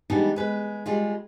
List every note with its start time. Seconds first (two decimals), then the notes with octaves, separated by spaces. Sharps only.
0.10 E3 G3 G#3 B3 D4 D#4
0.36 G#3 B4
0.86 G3 G#3 F4